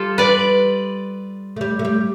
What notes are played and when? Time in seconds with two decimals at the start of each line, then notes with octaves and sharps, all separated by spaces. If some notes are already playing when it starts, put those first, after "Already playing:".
Already playing: G3 F4 A4
0.18 B4 D5
1.56 A3
1.61 G3
1.79 A3
1.85 G3